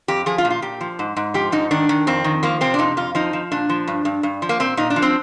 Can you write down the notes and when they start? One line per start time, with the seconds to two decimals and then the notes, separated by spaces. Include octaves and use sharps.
0.08 F2 G4
0.26 F3 G#4
0.38 F4
0.45 A#2
0.50 F4
0.62 A#2 G4
0.81 F3
0.99 G#2
1.16 G#2
1.34 F3 G4
1.52 G#2 D#4
1.71 D#3 D4
1.89 D#3
2.07 F2 C4
2.24 D#3
2.43 F3 A#3
2.61 C3 C4
2.74 D4
2.79 F2 D#4
2.97 F2 F4
3.15 F3 D#4
3.33 F3
3.52 A#2 D4
3.69 F3
3.88 G2
4.05 G2
4.23 G2
4.42 F3
4.49 A#3
4.60 A#2 C4
4.77 A#2 D#4
4.90 D4
4.96 F3
5.02 C4